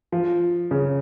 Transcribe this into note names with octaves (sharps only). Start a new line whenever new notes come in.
F3
C#3